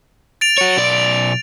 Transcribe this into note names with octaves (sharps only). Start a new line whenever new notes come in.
A6 D7 F7
F#4 C#5
B1 D5